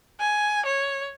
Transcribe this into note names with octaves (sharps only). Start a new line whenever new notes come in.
G#5
C#5